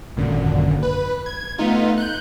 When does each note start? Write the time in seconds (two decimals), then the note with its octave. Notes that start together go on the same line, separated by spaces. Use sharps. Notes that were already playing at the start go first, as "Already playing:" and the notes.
0.17 G#1 F#2 A#2 D3
0.83 B4
1.26 G#6
1.58 A3 B3 D#4 F4
1.98 F#6 G6